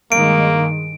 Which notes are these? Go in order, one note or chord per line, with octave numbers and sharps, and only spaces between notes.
G2 D#3 G#3 A#3 D7